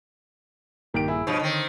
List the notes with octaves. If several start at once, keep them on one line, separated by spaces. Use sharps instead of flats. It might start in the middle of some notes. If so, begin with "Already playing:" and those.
A#1 G2 D#3 A#3 G4 D7
E4 G#4
G2 B2 F3 C#5
D3 D#3 C4